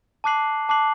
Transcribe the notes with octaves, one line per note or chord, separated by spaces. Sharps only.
A5 D6 F#6 C7 F#7
A5 D6 F#6 C7 F#7